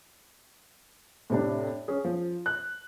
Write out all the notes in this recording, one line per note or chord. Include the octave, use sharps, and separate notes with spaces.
A2 C3 D4
C#4 G#4
F3
F#6